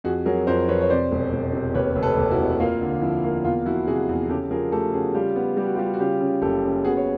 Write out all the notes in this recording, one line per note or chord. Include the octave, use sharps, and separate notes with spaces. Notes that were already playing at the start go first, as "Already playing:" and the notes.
F2 F#4 G#4
F#3 G#4 A#4
F2 A#4 C5
F2 B4 C#5
C#5
C3 C5 D5
E1
E1
C3
D#2 B4 C#5
F1
A4 B4
D#2
E4 F#4
F1
A#3 F4
D3
F3 E4
A#3
E2 F4
F3 E4 F#4
C3 F#4 G#4
E2
C#3 G4 A4
F3 G#4 A#4
A3 G4 A4
C#3 F#4 G#4
G3 F4 G4
B3
G3 G4
F#4
F4 G4
G3
F#4
C#3 F4 G4
C#3
F#1 G4 A4
C#3
B3 F#4 G#4
C#5